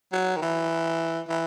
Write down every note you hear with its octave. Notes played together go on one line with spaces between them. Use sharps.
F#3
D#3
E3
E3